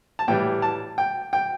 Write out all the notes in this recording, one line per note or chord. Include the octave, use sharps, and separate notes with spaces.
A5
A2 E3 G3 G5
A5
G5
G5